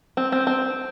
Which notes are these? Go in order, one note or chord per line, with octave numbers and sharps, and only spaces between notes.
C4
C4
C4